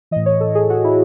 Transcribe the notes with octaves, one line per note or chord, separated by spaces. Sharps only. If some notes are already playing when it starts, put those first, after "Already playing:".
A2 E3 D#5
C#5
A4
G#4
F#4
E4